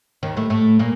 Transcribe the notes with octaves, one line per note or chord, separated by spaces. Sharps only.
D#2 D#3
A2 A3
A2 A3
A#2 A#3